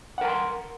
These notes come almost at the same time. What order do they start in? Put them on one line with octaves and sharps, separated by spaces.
F#5 A#4 G#5 C6